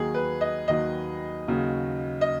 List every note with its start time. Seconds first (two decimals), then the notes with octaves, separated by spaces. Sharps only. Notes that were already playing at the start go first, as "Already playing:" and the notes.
Already playing: D#2 D#3 F#3 G#4
0.14 B4
0.41 D#5
0.68 D#2 D#3 F#3 D#5
1.48 D#2 C#3 F#3
2.21 D#5